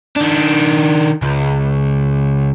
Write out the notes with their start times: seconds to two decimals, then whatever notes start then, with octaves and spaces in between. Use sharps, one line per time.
0.17 D#3 D4
1.22 C#2